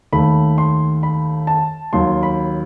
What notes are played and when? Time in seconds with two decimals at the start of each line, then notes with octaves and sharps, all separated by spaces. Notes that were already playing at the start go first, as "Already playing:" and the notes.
0.12 D#2 D#3 A3 B5
0.58 C6
1.03 B5
1.47 A5
1.93 D#2 D#3 F#3 C6
2.23 B5